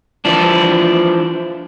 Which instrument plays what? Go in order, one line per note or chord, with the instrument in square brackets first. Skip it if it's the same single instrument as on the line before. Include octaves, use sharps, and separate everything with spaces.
[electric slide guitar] E3 F3 D4